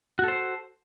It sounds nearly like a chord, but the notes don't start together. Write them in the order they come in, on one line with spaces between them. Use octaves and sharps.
F#4 A4 C5